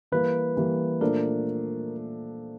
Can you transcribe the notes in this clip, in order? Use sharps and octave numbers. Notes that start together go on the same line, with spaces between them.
E3 G3 A#3 B4
E3 G3 A#3
A#2 F3 A3 D4 A#4